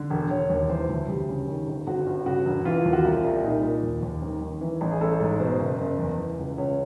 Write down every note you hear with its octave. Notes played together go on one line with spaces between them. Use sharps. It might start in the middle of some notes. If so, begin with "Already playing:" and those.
Already playing: D3
E1
E1 C#5
D#2
E3 C5
D2
D2 G4
C#3
D#3
G1
G1 F#4
G2
C#3 F#4
E1
E3 F4
D#2
F#4
C2 F4
C2
A#2 D#4
A#2
D#2
D#2
D#3 A#4
D#3
E3
A1
G#4
A1 A4
G#2
B2 C5
F#1
F#1
E2
E3
C#2
C#2 C#5